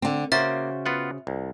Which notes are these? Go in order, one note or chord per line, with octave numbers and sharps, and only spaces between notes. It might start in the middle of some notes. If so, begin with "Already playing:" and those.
D3 C4
C#3 A#3 F#4 C5 E5 A6
B3 F4 F#5
C2